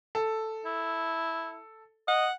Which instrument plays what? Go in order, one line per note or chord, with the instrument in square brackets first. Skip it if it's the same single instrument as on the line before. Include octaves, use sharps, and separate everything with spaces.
[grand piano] A4
[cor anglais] E4
[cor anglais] D#5 [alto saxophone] F#5